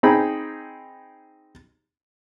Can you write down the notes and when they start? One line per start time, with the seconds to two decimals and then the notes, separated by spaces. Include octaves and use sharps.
0.03 C4 D#4 G#4 B5